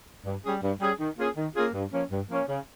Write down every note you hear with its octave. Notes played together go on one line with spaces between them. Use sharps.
G2
G3 C#4 G#4
G2
G3 C#4 G#4
D#3
A#3 C#4 F4 G#4
D#3
A#3 C#4 F4 G#4
G2
F3 A#3 C#4
G2
F3 A#3 C#4
C#3